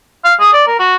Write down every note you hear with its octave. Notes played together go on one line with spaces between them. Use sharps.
F5
G#4
D5
A#4
F#4